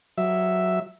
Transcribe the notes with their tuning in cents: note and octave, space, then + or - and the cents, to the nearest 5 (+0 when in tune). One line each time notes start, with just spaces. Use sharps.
F#3 +0 E5 +0